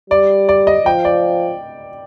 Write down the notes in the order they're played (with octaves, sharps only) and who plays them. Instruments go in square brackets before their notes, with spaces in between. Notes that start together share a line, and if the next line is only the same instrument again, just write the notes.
[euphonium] G3 [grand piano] D5
[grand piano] D5
D#5
[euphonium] F3 [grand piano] G5
[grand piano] D5